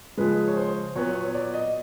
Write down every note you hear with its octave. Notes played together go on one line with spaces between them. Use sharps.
C#3 F3 G#3 B4
C#5
C5
A#2 F#3 B3 C#5
C#5
C#5
D5
D#5